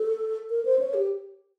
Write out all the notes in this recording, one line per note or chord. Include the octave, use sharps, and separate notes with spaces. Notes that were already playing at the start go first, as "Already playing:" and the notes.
Already playing: A4
A#4
C5
C#5
G4